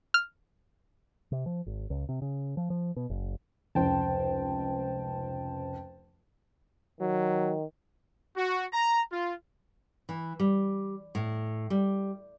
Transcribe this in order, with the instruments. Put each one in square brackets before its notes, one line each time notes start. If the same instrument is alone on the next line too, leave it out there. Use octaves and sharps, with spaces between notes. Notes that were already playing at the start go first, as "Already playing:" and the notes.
[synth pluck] F6
[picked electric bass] C3
F3
G#1
C#2
C3
C#3
F3
F3
B2
F#1
[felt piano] F1 C#2 [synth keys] C5 G5 A5
[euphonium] D#3 [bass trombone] F#3
[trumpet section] F#4
A#5
F4
[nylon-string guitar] E3
G3
A2
G3